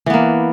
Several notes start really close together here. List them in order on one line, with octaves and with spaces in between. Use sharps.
E3 B3 A#3